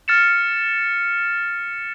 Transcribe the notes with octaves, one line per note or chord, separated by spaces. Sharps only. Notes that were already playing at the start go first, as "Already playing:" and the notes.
F6 A6 C#7 E7